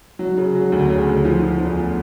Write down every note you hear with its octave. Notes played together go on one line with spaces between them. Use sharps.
F#3
C#3
F#3
D2
C#3
D2
F3
F3
E2